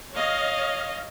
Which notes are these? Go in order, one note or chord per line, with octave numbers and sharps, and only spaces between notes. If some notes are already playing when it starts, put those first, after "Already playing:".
C#5 D#5 F5